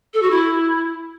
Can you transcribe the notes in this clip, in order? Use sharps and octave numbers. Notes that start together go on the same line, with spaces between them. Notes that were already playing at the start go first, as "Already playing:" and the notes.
A4
F#4
E4